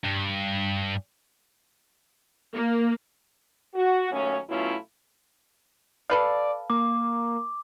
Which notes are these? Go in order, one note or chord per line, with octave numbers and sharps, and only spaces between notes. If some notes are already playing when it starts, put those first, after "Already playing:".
G2
A#3
F#4
D#2 F#3 A3 C#4
B2 F#3 A3 C#4 E4 F4
A4 B4 D5 F5
A#3 D6